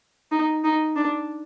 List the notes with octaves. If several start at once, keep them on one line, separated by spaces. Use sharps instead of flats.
D#4
D#4
D4